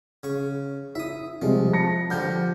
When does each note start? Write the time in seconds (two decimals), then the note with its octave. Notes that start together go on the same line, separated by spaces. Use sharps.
0.23 C#3 C#6
0.95 E4 E5 D#6
1.42 C3 F3 G3 G#3
1.73 A5 A#6 C#7
2.10 D3 F3 G3 F6 G6